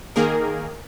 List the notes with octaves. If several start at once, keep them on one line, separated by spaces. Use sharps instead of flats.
D#3 A#3 G#4 A#4